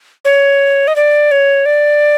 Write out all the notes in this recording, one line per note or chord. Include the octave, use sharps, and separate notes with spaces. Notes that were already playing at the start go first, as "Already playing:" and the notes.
C#5
D#5
D5
C#5
D5